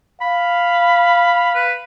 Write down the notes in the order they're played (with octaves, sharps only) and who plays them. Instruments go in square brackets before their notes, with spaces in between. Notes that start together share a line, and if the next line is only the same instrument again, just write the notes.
[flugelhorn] F5 [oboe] B5
[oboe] B4